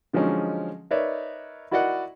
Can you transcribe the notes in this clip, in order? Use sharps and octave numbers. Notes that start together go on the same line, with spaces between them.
D3 F3 F#3 G#3 C#4 D#4
D#4 A#4 B4 C#5 D5 E5
E4 F#4 A#4 D5 D#5 F#5